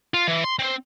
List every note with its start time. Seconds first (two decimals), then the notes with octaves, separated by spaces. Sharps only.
0.14 F4
0.28 E3
0.44 C6
0.59 C4